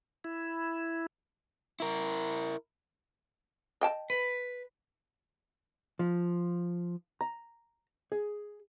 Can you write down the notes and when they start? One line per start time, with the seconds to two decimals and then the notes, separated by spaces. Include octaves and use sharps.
0.24 E4
1.80 E4 A#4
3.81 D#5 G5 A5
4.10 B4
5.99 F3
7.21 A#5
8.12 G#4